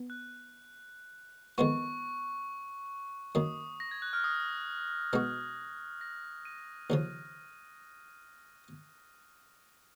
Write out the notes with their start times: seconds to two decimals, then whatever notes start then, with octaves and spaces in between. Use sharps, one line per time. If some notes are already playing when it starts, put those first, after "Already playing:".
Already playing: B3
0.10 F#6
1.58 F2 D#3 G#3 B3 F4 C#6
3.35 F#2 D#3 A#3 D#6
3.80 A#6
3.91 G#6
4.02 F#6
4.13 F6
4.24 D#6
5.13 B2 G#3 D#4 F#4
6.01 A#6
6.45 D#7
6.90 D#2 C#3 F3